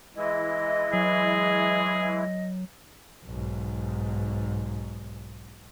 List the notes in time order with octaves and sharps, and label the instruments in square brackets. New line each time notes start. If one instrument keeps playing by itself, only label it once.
[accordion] E3 G#3 E4 [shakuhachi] D#5
[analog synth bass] F#3 [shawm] G#4
[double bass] B1 G#2